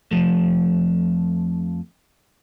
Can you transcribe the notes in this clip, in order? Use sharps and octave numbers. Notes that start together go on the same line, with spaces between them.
F2 E3 F3 A3